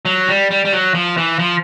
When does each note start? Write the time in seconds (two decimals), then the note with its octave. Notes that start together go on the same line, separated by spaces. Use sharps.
0.05 F#3
0.28 G3
0.51 G3
0.65 G3
0.73 F#3
0.94 F3
1.17 E3
1.39 F3